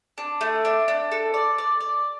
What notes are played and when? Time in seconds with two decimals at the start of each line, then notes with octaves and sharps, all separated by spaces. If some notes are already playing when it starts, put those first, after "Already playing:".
0.18 D4
0.41 A3
0.65 D4
0.88 D4
1.11 A4
1.34 D5
1.58 D5
1.81 D5